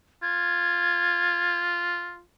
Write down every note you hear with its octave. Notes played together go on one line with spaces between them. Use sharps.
F4 G#6